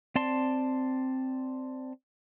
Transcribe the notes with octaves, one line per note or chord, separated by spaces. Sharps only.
C4 D5 A5 C6